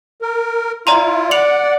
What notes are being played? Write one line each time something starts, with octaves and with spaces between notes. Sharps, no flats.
A#4
E4 F4 D5 A#5 C6
D5 F#5 C#7 F7 F#7